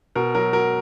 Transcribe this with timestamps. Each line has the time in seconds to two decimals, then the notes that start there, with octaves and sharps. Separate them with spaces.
0.15 B2 A#4
0.35 F#3 A#4
0.53 F#3 A#4